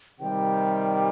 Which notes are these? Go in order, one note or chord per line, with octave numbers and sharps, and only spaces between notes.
C3 D#3 G3 G5